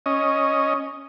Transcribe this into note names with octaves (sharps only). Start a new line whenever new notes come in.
C#4 D#5